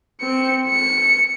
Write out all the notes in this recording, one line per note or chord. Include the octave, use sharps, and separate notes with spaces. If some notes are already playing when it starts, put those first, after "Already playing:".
C4 C#7
C#7